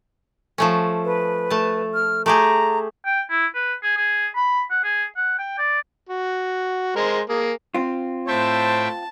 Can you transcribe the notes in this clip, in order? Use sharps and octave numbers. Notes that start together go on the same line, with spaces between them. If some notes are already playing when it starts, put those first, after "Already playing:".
F3 A3 C#4
B4
A3 A5
F6
A3 G4 G#4 A#5
G5
E4
B4
G#4
G#4
B5
F#5
G#4
F#5
G5
D5
F#4
G#3 A#4 C5
A#3 G#4
C4 F4
A2 C5 E5 G5 A5